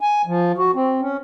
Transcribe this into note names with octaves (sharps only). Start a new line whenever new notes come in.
G#5
F3
F#4
C4
C#4